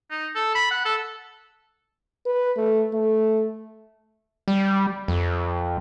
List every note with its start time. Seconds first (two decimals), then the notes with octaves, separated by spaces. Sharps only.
0.10 D#4
0.35 A4
0.55 B5
0.71 F#5
0.85 A4
2.26 B4
2.57 A3
2.94 A3
4.48 G3
5.08 F2